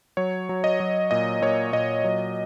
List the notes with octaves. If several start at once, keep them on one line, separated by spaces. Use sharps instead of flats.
F#3 C#5
F#3
D#5
F#3
A#2 D#5
A#2 C#5
A#2 D#5
F#3